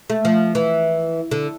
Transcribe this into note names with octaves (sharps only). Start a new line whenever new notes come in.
A3
F3
E3
D3